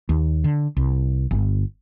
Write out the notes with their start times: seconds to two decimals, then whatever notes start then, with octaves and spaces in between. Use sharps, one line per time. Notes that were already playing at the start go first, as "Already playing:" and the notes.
0.09 D#2
0.44 D3
0.77 C2
1.31 G1